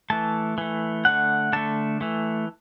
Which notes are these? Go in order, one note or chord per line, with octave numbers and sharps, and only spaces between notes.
E3 A3 A5
E3 A3
D3 A3 F#5
D3 A3 A5
E3 A3